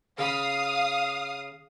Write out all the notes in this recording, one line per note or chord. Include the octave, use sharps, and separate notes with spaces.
C#3 F5 B5 D#6